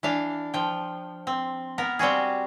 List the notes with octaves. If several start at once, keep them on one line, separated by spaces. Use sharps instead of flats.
E3 D4 F5 A5
F3 G5
C4
B3 A#4
G3 C4 F#4 G#4